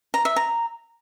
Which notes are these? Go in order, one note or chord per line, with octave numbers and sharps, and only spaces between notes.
A#5
E5
A#5